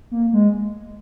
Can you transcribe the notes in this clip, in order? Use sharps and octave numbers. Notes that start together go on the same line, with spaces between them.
A#3
G#3